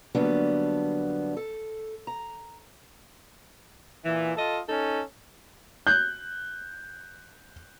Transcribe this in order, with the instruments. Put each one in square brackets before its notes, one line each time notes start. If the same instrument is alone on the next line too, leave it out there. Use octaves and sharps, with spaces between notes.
[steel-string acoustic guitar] D3 F#3 G3 A#3 B3 D4
A4
A#5
[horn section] A#2 E3
F4 A4 D#5
C#4 D#4 A4
[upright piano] F#6 G6